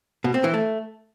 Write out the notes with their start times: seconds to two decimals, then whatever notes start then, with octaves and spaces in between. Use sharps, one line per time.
0.24 B2
0.34 C4
0.44 E3
0.54 A3